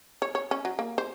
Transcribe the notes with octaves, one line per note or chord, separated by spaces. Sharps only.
C#5
C#5
C#4
F#3
A#3
C5